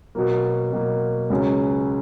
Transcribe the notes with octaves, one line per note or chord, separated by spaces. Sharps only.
B2 F#3 A#3
B2 F#3 A#3
C#2 C#3 F#3 C#4 G#4